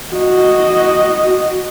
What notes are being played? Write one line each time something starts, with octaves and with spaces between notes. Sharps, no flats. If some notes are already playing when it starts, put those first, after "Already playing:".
F#4 D#5